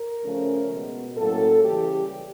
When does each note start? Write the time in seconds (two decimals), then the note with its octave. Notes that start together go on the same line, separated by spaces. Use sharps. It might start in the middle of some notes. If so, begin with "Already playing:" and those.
Already playing: A#4
0.24 C#3 F3 A3 C#4
0.71 B2 G#3 B3
1.17 A2 F#3 A#3 C#4 A4
1.63 C#3 E3 G3 G4